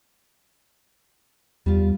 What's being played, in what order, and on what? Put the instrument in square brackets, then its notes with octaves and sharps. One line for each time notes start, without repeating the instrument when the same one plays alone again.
[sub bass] E2 [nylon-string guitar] G3 F4